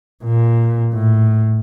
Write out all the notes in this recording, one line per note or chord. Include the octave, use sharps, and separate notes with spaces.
A#2
A2